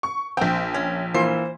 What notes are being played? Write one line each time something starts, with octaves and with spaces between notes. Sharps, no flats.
C#6
A#1 C4 G5
C#4
E3 A#3 F4 C5